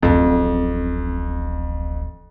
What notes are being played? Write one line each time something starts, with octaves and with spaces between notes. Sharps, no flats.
D1 A1 F2